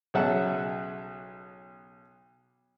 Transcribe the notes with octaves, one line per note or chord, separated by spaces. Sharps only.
B1 C#3 F#3 E5 F#5 A5